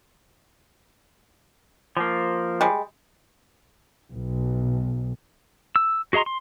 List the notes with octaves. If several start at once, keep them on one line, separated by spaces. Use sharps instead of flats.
F3 A#3
G3 G#3
B1
E6
F#4 G#4 D#5 A#5 C6
C6